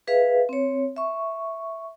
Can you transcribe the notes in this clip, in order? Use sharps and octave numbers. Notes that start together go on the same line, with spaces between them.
G#4 B4 E5 F5
C4 C#5
E5 C#6